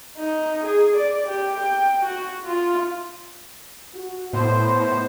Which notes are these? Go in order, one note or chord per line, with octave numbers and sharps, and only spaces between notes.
D#4
G#4
D5
G4
G5
F#4
F4
F#4
A2 B3 C5 D#5